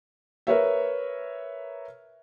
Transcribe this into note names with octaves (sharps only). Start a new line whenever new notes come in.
A#4 B4 C#5 E5